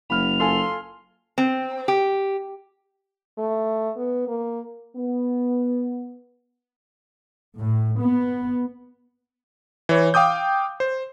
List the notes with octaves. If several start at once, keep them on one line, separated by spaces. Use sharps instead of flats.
F#1 B5 F6 F7
F4 A4 G#5 C6
C4
G4
A3
B3
A#3
B3
A2
B3
E3 C#5
F5 G5 D6 D#6 G6
C5